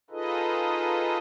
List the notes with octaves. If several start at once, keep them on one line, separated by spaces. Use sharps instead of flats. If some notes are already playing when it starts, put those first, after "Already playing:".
D#4 F4 G#4 A4 B4 D#5